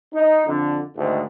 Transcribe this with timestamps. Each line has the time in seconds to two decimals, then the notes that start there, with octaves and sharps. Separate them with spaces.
0.13 D#4
0.45 F2 D3
0.95 D2 G#2 D#3